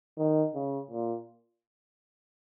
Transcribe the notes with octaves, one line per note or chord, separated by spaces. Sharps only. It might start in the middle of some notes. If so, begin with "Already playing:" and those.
D#3
C#3
A#2